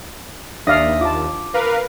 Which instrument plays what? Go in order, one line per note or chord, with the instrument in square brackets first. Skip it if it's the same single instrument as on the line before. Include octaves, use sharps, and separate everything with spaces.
[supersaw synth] D#2 [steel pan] D4 D5 F5 [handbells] E5 D#6 A#6
[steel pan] F4 A5 [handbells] D6
[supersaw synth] A#4 B4 F5